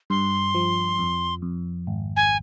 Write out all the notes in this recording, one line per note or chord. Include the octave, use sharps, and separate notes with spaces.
G2 C6
F3
F2
F2
G#1
G#5